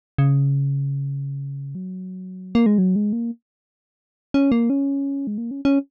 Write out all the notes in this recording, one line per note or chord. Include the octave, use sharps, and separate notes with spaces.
C#3
F#3
A#3
G#3
F#3
G#3
A#3
C#4
A#3
C#4
G#3
A#3
C#4
C#4